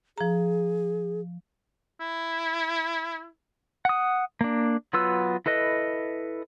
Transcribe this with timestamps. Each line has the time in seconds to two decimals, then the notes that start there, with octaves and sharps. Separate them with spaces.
0.18 F3 G#4 A#5
2.00 E4
3.85 F#5 D#6
4.41 A#3 D4
4.93 F#3 B3 F4 B4 E6
5.46 E4 A4 B4 D#5